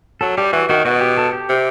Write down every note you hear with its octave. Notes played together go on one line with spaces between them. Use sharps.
F#3 A4
G3 G4
E3 F#4
D#3 F#4
B2 F#4
G4
A4
G4
C3